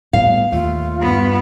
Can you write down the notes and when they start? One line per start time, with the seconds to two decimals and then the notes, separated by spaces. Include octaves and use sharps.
0.13 A2 G3 B3 F5
0.52 D#2 A3 F4
0.99 G2 B3